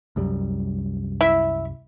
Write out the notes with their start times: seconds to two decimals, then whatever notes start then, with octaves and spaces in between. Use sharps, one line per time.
0.16 C2 F#2 G3
1.21 E4 E5